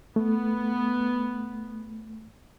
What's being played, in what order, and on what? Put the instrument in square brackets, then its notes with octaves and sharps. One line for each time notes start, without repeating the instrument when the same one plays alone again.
[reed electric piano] A3 [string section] B3